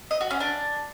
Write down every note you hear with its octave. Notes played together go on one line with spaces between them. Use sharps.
D#5
F#4
C#4
D4